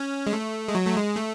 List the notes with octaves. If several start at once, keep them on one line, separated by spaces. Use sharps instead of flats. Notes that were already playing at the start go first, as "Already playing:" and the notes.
Already playing: C#4
G#3
A3
G#3
F#3
A3
G#3
A3